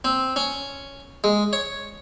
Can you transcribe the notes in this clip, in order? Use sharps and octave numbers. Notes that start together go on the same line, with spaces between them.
C4
C#4
G#3
C#5